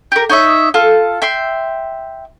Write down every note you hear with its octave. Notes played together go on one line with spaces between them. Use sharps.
G4 A#4
D#4 C#5 D#5 E5
F4 A4 A5
E5 G5 C6